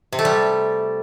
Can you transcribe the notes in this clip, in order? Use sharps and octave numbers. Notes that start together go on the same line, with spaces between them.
C3
A3
G3